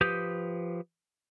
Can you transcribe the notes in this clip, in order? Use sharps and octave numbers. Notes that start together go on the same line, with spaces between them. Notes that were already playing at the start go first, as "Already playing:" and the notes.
F3 G4 B4 D#6 G6